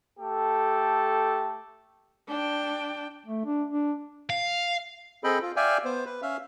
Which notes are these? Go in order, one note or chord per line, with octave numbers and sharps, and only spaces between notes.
A3 G4 A4
D4 G5
A3
D4
D4
F5
C4 G#4 A4 D#5 G5 B5
F4
D5 E5 F5 G5 G#5
B3 C5
B4
C#4 E5 F5